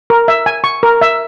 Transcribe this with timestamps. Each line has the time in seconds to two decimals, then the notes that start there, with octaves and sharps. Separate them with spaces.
0.10 A#4
0.28 E5
0.46 G#5
0.64 C#6
0.83 A#4
1.01 E5